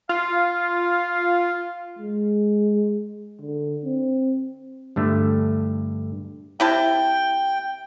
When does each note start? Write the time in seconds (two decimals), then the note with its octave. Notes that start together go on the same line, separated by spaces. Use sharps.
0.09 F4 F5
1.99 G#3
3.42 D3
3.85 C4
4.96 G2 D3 A3
6.60 C3 E4 G5 A5